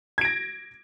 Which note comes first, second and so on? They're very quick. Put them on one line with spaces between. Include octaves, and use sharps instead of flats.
G#6 D7 A#6